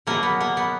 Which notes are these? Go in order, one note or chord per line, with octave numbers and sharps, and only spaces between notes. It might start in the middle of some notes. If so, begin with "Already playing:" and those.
B2 F#3 A#3
B3
A#3
B3